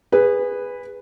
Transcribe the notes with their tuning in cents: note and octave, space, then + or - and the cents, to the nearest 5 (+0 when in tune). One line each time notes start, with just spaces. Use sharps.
G#4 -25 B4 +0